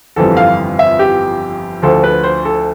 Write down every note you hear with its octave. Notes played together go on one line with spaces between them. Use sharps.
G1 F2 E3 G3 A4
F5
E5
G4
D2 D3 F3 A4
B4
C5
A4